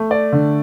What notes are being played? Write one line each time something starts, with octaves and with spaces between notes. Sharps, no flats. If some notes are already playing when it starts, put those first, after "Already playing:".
Already playing: A3
D5
D3